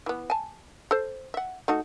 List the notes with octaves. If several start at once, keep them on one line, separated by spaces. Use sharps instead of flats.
E3 B3
G#5 A5
A4 C5
E5 F#5
A3 D#4 F#4